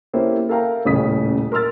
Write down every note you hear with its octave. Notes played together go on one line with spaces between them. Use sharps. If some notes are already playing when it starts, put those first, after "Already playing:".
A#3 C#4 E4 G4 A4 C5
A4 A#4 E5 F5 G5 A#5
D#1 A1 C#3 D#6 B6
A#4 C6 E6 F6 A6